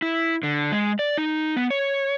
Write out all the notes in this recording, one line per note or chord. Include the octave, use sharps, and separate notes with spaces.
E4
D3
G#3
D5
D#4
B3
C#5